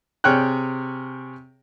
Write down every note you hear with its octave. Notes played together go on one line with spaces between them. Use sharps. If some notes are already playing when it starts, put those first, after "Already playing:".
C3 G#4 C#5 G5 F6 F#6